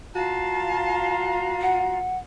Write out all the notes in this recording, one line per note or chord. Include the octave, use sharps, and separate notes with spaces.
F4 F#4 F5 A5 A#5
F#5